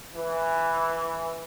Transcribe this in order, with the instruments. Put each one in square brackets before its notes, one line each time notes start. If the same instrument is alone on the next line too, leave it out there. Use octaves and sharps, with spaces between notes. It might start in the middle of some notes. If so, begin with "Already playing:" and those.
[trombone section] E3